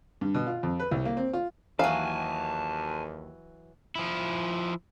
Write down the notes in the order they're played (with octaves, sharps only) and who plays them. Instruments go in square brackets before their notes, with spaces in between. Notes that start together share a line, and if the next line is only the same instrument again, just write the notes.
[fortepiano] G2
B2
F4
F2
B4
C2
A#3
C4
F4
[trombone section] D#2 [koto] E3 F#3 [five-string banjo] F5 [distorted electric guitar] G#5 A5
[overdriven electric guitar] F3 E4